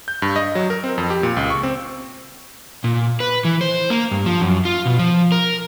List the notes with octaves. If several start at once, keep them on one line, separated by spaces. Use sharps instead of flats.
G6
G2
D#5
F#3
A#4
C4
F2
G4
A#2
C#2
C#6
C4
A#2
B4
E3
C5
A#3
G2
F3
F#2
F4
B2
F3
A#4